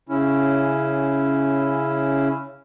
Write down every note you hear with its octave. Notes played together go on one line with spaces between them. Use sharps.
C#3 C#4 E4